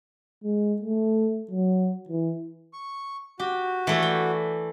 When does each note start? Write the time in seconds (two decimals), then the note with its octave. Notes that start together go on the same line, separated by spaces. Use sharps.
0.43 G#3
0.82 A3
1.51 F#3
2.09 E3
2.73 C#6
3.39 F#4 G4
3.87 E3 A3 D5
4.02 G5